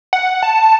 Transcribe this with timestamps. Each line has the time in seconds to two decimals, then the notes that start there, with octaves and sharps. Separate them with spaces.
0.13 F#5
0.43 A5